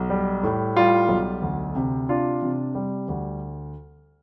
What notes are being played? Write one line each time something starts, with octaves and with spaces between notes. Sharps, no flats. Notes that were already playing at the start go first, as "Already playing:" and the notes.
Already playing: B1
G3
A2
G3 F4
B1
D2
C3
D4 F4
C3
G3
D2